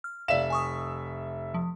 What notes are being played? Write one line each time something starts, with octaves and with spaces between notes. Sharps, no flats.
F6
F1 D5 E5 F5 E7
G#5 C#6 D#6
F3